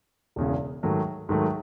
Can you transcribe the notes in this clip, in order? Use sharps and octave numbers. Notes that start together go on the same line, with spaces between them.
E1 E2 C#3
G#2 D#3 F#3 A3
G#2 D#3 F#3 A3